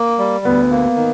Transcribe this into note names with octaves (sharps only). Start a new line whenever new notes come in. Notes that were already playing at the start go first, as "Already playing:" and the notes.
Already playing: A#3
G3
D2 B3
A#3
D#3